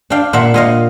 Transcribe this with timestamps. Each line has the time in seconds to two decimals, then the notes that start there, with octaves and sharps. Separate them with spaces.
0.10 D4 F5 G5
0.33 A#2 E5 F#5
0.54 A#2 D#5 F5